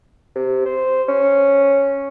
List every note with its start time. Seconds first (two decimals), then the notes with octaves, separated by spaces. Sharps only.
0.35 C3
0.65 C5
1.08 C#4